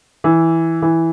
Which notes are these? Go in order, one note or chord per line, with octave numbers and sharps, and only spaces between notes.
E3
E3